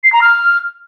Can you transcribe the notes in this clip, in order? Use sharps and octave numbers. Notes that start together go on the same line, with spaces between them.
C7
A#5
F6